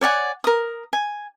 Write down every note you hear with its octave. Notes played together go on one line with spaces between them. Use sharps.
C#5 D5 F#5 G#5
A#4 D#6
G#5